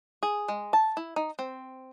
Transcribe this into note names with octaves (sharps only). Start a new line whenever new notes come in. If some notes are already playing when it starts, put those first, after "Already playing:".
G#4
G#3
A5
E4
D#4
C4